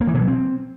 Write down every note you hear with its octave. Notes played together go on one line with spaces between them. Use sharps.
A#3
E3
B2
F#3
C4